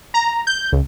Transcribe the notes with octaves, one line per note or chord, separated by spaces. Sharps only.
A#5
G6
C#2